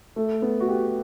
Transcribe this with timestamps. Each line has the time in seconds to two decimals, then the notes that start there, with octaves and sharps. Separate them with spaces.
0.16 A3
0.42 B3
0.60 F#4
0.68 G4